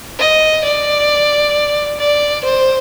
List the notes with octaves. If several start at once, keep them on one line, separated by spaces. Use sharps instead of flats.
D#5
D5
D5
C5